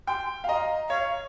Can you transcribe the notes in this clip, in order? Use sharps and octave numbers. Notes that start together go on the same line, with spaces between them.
G5 C6
F5
D#5 A#5
C#5 F5